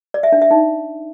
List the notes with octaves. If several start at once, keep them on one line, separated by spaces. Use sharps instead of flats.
D5
E5
D4
E5
D#4